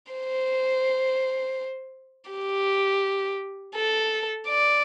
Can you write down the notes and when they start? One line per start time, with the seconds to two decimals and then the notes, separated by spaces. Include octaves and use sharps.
0.12 C5
2.31 G4
3.75 A4
4.48 D5